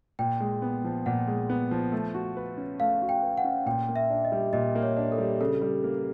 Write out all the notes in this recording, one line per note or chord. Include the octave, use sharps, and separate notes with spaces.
A#2 G5
G#3
B3
F3
A#2 F#5
G#3
B3
F3
A3
F#4
B4
C#4
A3 F5
F#4
G5
B4
F#5
C#4
A#2 G5
A#3
E5
D4
D#5
G3
A#2 D#5
A#3
C#5
D4
A4
G3
C#3 A4
G3
A#3